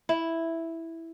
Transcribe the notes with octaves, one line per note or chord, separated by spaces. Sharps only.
E4